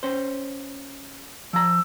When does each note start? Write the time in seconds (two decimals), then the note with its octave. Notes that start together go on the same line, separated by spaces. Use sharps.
0.03 C#4 C5
1.53 F3 A#5 E6